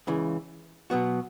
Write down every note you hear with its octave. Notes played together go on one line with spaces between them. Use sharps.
C#2 C#3 E3
B2 F#3 B3 F#4